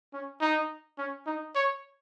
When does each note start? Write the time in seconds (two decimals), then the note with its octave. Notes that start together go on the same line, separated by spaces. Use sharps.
0.13 C#4
0.41 D#4
0.98 C#4
1.27 D#4
1.55 C#5